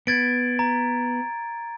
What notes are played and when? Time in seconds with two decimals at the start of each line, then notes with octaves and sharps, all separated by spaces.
0.07 B3 G#6 A6 D7
0.59 A#5